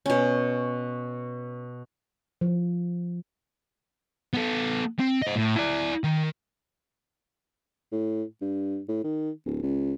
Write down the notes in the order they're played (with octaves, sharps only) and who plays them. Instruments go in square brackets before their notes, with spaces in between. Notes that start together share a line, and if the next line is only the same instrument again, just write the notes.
[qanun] B2 C#4
[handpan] F3
[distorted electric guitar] B3 A4
C4
C5 D#5
A2
E4 D5
D#3
[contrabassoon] A2
G2
A2
D#3
D1
C#2